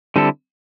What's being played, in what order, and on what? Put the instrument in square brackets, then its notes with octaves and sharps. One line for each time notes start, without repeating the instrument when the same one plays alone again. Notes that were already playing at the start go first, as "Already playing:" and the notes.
[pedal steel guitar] D3 G3 C4 E4 A4